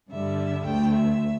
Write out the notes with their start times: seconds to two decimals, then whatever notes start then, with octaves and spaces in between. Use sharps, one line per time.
0.11 G2 D3 G3 E5
0.66 D2 D3 A3 G5
0.95 E5